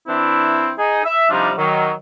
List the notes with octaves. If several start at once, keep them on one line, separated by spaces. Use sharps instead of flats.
E3 C4 D4 E4
D#4 G#4
E5
C3 F3 G3 D4 D#4 F4
D#3 F#3